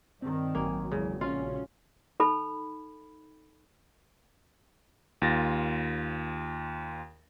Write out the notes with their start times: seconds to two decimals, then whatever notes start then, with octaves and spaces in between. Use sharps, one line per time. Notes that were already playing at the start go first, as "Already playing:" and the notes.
0.21 G2 D#3 C4 D5
0.55 A1 F#3 A#3 G5 G#5
0.92 E2 C#3 G#3
1.21 A#1 C#3 C#4 F4 F#4 C#5
2.20 D#4 A4 B5
5.22 D#2 F4 A6 A#6